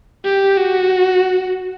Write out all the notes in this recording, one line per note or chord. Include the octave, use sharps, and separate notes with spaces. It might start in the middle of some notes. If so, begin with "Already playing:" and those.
G4
F#4